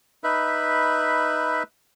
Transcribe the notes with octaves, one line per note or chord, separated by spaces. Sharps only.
D#4 B4 E5 B5